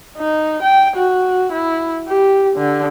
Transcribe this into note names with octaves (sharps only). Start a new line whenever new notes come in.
D#4
G5
F#4
E4
G4
D3